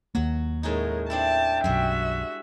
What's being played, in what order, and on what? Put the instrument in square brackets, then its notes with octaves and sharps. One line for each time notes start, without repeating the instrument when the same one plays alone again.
[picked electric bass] D#2 A#3 [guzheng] F#3 F#4
[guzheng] A2 C#4 D#4 [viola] G#3 A#4
[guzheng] C4 D4 E4 [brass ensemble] G5 [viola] A5
[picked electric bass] B1 F#2 [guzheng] G3 G#3 [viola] F#4 E5